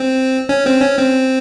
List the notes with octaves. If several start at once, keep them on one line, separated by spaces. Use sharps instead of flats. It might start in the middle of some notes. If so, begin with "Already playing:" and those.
Already playing: C4
C#4
C4
C#4
C4